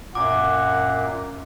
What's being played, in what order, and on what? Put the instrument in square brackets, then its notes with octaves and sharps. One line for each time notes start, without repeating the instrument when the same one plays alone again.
[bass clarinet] F#2 [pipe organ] A#2 [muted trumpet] F#5 [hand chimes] D6